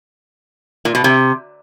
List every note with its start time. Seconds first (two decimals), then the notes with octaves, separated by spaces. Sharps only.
0.85 A#2
0.95 B2
1.04 C3